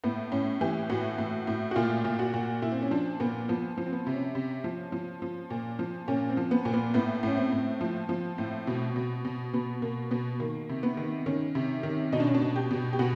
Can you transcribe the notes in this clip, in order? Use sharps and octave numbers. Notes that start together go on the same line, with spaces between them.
A2 B3
A2 C#4
E3 G4
A2 F#4
A2
A2
F#4
A#2 F4
A#2
F#4
A#2
A#2 E4
C4
C#4
F3 D4
A#2 B3
F3 B3
F3
C4
B3
C3
C#4
C3
F3
F3
F3
A#2
F3
A#2 C#4
C4
F3
B3
A#2
B3
A2 B3
A2 C#4
C4
A2
F3
F3
A2
B2
B2
B2
B2 B3
B2 A#3
B2 B3
D#3 A#3
C3
B3
D#3
D#3 C#4
C3
D#3
B2 D#4
D4
C#4
D4
B2
G4
B2
G4
B2 F#4